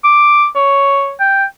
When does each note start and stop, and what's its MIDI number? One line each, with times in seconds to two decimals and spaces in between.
0.04 0.47 86
0.56 1.13 73
1.20 1.45 79